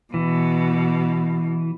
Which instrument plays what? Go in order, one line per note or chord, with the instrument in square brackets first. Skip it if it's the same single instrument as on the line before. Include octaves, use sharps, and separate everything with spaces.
[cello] B2 [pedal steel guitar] E3